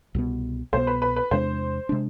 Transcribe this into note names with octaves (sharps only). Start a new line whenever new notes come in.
C2 B2 B3
C2 B2 B3 C5
B4
B4
B4
E2 C3 G#3 D4 C5
C3 G#3 D4